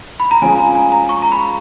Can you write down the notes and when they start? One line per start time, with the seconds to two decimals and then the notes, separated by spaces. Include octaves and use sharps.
0.20 B5
0.31 A#5
0.42 F3 G#3 C#4 F4 G#4 G#5
0.59 A#5
0.75 G#5
0.92 A#5
1.09 C#6
1.22 A#5
1.32 B5